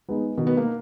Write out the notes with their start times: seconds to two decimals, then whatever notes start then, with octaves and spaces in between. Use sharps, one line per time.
0.09 G#3 B3 D#4
0.37 B2 D#3
0.47 B3
0.57 A#3